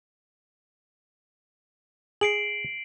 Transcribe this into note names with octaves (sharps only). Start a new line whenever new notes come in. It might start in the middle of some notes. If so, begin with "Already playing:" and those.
G#4 C7 D7 F#7